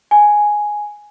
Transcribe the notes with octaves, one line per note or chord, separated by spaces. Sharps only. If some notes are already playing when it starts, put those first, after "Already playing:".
G#5